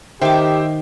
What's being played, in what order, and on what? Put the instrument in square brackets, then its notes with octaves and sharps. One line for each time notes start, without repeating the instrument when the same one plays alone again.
[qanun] D#3 C6 D6 [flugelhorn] G4 [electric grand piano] C5 E5 G5